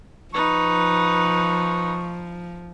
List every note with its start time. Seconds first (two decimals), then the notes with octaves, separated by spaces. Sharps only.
0.34 F3 D#4 B4 C#6